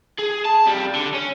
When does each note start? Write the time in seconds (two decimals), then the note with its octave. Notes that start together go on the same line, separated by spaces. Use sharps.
0.19 G#4
0.45 A5
0.66 F2 G3
0.95 D3
1.14 C#4